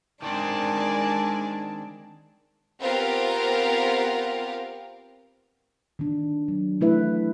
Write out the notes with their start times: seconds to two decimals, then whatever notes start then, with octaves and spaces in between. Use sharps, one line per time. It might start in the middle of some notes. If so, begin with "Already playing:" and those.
0.22 D#3 G#3 C4 D4 A#4 D5 G#5 A5
2.80 B3 C4 F4 G4 A#4 F5
5.99 D#3 D4
6.48 F#3
6.81 A3 E4 B4 E5